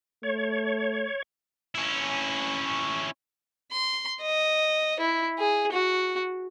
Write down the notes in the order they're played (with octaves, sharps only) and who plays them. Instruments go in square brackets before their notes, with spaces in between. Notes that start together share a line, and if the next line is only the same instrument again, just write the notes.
[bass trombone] A3 [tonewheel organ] C#5
[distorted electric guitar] C#4 E4
[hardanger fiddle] C6
D#5
E4
G#4
F#4